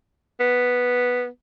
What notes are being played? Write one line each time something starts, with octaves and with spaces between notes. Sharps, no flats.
B3